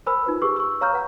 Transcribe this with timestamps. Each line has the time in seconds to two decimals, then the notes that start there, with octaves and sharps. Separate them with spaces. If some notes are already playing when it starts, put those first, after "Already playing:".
0.06 A#4 C5 G#5 B5 E6
0.26 D#4 F4 B4
0.42 G4 G#4 B4 C#6 D6 E6
0.56 C#6 E6
0.81 C#5 F5 A#5 C#6 F6 G6
0.93 B4 F#5 A#5